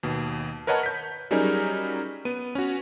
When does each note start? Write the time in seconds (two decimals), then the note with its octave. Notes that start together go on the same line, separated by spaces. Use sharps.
0.03 D#2 B2
0.67 A#4 B4 C#5 D#5 F#5 A5
0.83 G6 B6
1.31 F#3 G3 C#4 D#4 G#4 A#4
2.25 B3 D#7
2.55 C#4 F#4